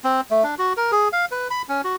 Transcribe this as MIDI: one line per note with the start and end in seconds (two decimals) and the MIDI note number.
0.04 0.21 60
0.31 0.44 57
0.44 0.55 62
0.58 0.73 66
0.77 0.91 70
0.92 1.08 68
1.13 1.25 77
1.31 1.48 71
1.50 1.62 83
1.69 1.81 61
1.84 1.96 66